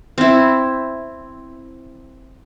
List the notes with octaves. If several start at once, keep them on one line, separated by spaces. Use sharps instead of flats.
C4 E4